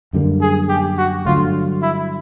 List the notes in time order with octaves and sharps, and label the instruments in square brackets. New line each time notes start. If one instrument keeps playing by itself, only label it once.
[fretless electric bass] F#2 D3 G3 A#3
[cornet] G#4
G4
F#4
[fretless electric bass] G2 D3 F#3 A3 [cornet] F4
[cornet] E4